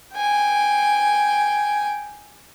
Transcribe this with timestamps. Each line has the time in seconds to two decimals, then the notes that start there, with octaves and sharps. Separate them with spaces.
0.16 G5 G#5